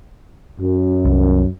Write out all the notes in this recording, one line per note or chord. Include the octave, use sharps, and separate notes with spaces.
F#2
C2